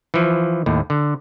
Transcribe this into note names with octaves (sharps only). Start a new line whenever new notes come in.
E3 F3
D#2 A2
D3